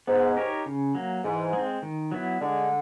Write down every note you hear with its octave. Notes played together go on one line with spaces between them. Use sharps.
G#2 B3
D#4 G4 A#4 C#5
C#3
F#3 A#3
G#2 E3
G#3 C4
D#3
F#3 B3 E4
D3 G#3